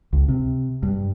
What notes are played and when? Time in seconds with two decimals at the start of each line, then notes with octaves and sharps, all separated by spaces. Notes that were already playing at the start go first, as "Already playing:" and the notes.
0.13 C#2
0.28 C3
0.83 G2